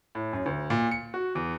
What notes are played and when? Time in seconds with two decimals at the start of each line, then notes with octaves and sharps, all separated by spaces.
0.15 A2
0.33 F#2
0.46 D2
0.70 A#2
0.91 C#7
1.14 F#4
1.35 E2